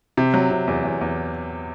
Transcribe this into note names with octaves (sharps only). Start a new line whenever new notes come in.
C3
F#3
C3
E2
E2
E2